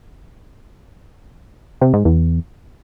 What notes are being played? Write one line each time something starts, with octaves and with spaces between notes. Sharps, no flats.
C3
G#2
E2